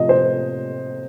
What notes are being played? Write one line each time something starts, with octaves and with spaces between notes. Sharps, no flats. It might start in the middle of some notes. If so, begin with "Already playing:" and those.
Already playing: C3 F3 D#5
C5